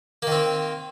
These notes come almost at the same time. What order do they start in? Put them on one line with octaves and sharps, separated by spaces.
A#3 D#3 C4